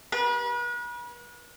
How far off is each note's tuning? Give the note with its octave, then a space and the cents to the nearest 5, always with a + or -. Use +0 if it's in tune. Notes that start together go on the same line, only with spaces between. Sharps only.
B4 -40